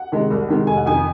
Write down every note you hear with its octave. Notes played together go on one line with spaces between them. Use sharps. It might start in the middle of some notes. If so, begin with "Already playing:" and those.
Already playing: F#5
C3 D#3 G#3
C2
C3 D#3 G#3
F1 G#5
F#5
F2 D#3 G#5